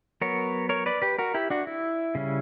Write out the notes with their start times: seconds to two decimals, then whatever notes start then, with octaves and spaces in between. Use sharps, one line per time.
0.21 F#3 B3 A#4 C#5
0.69 A#4 C#5
0.86 B4 D5
1.02 G4 B4
1.19 F#4 A#4
1.34 E4 G4
1.50 D4 F#4
1.67 E4
2.15 C#3 G3 C#4